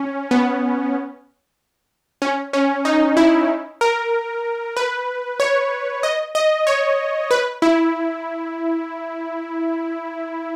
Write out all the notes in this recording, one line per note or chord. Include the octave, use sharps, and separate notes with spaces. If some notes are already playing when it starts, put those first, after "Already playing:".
Already playing: C#4
B3
C#4
C#4
D#4
E4
A#4
B4
C#5
D#5
D#5
C#5
B4
E4